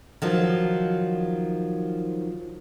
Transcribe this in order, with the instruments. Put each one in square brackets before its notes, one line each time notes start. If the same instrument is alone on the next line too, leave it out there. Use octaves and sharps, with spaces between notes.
[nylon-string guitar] D#3 F3 F#3